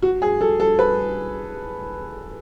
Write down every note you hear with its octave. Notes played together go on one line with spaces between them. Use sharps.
F#4
G#4
A4
A4
B4